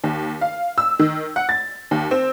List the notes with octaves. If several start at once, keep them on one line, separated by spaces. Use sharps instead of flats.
D#2
F5
E6
D#3
F#5
A6
D#2
C4